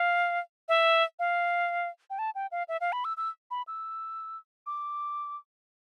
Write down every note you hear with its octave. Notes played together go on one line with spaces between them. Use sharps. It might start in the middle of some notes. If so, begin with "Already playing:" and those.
Already playing: F5
E5
F5
G5
A5
G5
F5
E5
F5
B5
E6
E6
B5
E6
D6